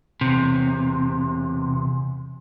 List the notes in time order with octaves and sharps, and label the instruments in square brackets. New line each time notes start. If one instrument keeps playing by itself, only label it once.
[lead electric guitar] E2 C3